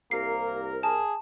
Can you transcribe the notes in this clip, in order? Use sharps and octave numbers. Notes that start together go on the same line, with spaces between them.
C2 A#3 A#4 C7
G#4 A5